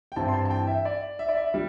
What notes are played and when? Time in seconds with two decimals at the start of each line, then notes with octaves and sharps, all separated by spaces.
0.12 G5
0.16 G2 E3 C4 E4 A5
0.28 C6
0.34 A5
0.45 A5
0.50 G5
0.67 E5
0.85 D5
1.19 E5
1.29 D5
1.37 E5
1.54 G3 D4